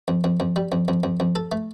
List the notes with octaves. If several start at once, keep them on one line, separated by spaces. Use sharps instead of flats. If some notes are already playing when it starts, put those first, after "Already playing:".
F2
F2
F2
G3
F2
F2
F2
F2
A4
A3